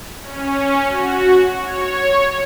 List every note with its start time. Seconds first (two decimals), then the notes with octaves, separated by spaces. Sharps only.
0.23 C#4
0.88 F#4
1.58 C#5